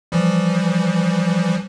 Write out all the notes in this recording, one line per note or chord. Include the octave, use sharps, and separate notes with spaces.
E3 F3 G3